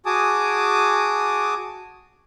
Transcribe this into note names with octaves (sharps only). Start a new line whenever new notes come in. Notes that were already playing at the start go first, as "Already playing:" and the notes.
F#4 G#4 G#5 A5 D6 D#6